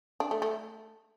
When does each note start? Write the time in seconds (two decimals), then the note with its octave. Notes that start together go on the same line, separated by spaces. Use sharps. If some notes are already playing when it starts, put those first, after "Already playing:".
0.20 D4
0.31 A3
0.42 A3